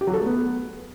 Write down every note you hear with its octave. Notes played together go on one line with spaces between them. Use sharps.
G4
F#3
A4
A3
B3